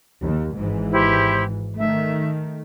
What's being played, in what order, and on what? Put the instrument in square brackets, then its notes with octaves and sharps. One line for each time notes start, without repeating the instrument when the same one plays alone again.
[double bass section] D#2
G#1 G#2 E3
[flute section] E4 G4 C5
[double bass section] D#3 A3 [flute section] E5